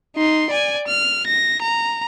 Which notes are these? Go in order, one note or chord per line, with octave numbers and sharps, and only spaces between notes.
D#4 C6
D5 G#5
F6
A#6
A#5